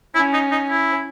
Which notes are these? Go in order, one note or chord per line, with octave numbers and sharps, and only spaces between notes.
C#4 E4
D#4
D#4
E4